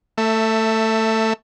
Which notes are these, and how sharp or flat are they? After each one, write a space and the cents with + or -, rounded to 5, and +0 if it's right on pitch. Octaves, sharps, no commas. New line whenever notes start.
A3 +15 E5 +0